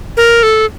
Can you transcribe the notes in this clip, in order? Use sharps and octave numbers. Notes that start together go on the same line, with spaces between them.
A#4
A4